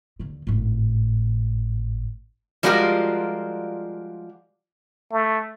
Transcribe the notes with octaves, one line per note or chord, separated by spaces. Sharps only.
D#2 D3
G#1 A2
F3 G3 G#3 F4 F#4 A#4
A3